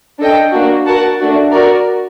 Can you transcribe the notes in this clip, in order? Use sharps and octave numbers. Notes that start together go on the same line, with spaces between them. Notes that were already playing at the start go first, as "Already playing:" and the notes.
D4 A4 D#5 G5
A#3 D4 F#4
F#4 A#4 F#5 A5
A3 D4 F#4
F#4 A#4 D5